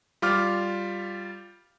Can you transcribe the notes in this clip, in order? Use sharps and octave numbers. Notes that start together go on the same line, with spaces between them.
G3 F4 D6 F6